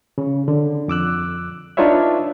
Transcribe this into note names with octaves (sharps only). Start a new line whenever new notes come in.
C#3
D3
F2 D6 E6 F#6
D4 D#4 F4 B4 C#5 E5